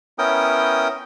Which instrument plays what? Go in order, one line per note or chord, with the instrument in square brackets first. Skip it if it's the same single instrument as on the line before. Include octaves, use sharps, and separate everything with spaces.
[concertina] B3 C#4 E4 A#4 G5 D#6